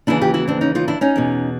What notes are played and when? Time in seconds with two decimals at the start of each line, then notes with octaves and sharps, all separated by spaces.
0.07 D#2 C#3 E3 D4 E4
0.21 F4 G4
0.34 E4 F#4
0.47 C4 D4
0.61 C#4 D#4
0.75 D#4 F4
0.88 D4 E4
1.01 C#4 D#4
1.16 E2 B2